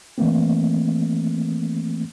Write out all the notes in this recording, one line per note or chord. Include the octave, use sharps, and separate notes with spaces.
E3 A3 A#3 C4